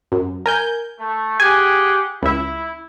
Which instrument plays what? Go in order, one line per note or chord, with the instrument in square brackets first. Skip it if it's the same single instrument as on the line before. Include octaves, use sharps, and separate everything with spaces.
[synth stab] F#2
A#4 G#5 G6
[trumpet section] A3
[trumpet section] G4 G#4 F#5 [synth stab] G#5
[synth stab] C#2 E5 [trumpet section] E4